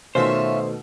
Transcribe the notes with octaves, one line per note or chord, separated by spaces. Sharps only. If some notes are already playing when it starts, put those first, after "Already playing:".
B2 D#3 A3 C#4 F4 C5 E5